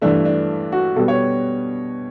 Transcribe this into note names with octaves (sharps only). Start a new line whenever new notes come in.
G2 E3 A3 D4
D4
F#4
B2 G3 B3 A4
C#5